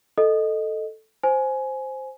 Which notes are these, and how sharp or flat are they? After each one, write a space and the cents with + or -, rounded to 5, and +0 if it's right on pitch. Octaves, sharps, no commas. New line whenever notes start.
A4 +0 D#5 +0
C5 +0 G#5 +15